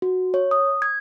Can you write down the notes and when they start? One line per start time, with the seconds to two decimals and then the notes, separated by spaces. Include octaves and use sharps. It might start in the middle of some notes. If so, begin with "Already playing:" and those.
0.02 F#4
0.34 C#5
0.51 D#6
0.82 G#6